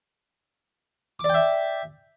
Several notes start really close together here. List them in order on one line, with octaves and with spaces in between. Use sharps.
D6 D5 G5 E5